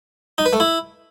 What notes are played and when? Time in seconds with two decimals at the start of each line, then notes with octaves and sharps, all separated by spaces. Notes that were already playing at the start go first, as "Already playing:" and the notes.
0.38 D#4
0.46 B4
0.53 A3
0.60 E4